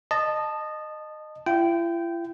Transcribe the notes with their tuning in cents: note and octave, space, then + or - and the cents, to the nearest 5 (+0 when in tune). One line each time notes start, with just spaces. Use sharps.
D#5 -20 A5 +0
E4 +45 G5 -15